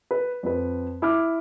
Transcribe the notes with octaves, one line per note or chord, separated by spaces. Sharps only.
B4
F2 B4
E4 D6 F6